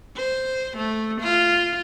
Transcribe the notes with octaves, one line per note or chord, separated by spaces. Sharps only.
C5
A3
F4